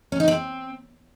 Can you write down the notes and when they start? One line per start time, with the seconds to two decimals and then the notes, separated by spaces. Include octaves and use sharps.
0.12 C#4
0.20 D#4
0.28 C4